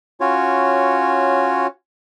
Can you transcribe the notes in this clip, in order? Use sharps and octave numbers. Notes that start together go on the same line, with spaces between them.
C#4 F4 F#4 C#5